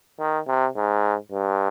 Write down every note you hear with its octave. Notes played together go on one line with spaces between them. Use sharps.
D#3
C3
G#2
G2